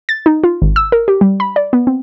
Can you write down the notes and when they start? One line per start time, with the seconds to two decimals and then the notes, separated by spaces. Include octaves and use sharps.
0.09 A6
0.26 D#4
0.44 F4
0.62 G#1
0.76 E6
0.92 A#4
1.08 G4
1.21 G3
1.40 B5
1.56 D5
1.73 B3
1.87 C4